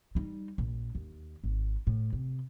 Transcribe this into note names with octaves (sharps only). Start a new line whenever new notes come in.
G3 D#4
A#1
D#2
G#1
A2
C3